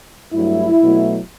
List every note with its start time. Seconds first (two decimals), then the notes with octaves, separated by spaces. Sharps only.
0.33 G2 F#3 A3 E4
0.81 B2 F#3 A3